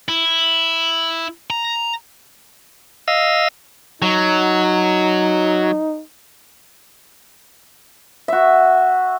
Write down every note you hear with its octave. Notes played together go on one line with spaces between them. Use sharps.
E4
A#5
D#5 F5 E6
F#3 D#4
F#4 E5